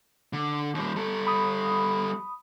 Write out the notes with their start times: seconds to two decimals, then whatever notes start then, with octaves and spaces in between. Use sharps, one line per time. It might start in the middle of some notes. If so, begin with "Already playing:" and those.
0.33 D3
0.75 D#2 G3
0.96 G3 A4
1.27 B5 D#6